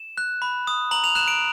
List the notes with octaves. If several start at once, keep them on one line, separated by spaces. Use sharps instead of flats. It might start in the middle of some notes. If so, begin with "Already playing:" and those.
Already playing: E7
F#6
B5
D#6
A#5 F#7
F7
F#6 E7
D7